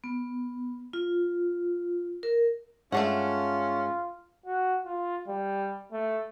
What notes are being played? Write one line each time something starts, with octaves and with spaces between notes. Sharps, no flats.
B3
F4
A#4
G2 G#3 A3 C#4 D4 F4 G#4 F#5
F#4
F4
G3
A3